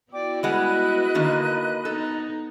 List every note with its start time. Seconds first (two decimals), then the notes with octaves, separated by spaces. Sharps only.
0.12 B3 E4 F#4 D5 G5 D6
0.43 G3 G#3 B4 D#5 F#5 F#6
1.15 D3 D#3 A#3
1.85 B3 D#4 A4